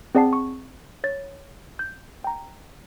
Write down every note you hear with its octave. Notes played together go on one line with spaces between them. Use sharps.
C4 G#4 D5 F#5 A5 C7
C#6
C#5 A6
G6
G5 A#5